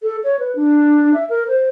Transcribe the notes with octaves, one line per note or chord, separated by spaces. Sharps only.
A4
C#5
B4
D4
E5
A#4
C5